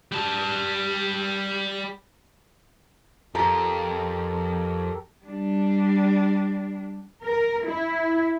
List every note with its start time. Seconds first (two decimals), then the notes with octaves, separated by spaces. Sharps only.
0.12 G3 A5
3.35 F2 G4 A4 A#4 A#5
5.25 G3 D4
7.24 A#4
7.64 E4